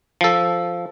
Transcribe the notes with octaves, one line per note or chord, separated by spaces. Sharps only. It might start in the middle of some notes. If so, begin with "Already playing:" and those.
F3 A4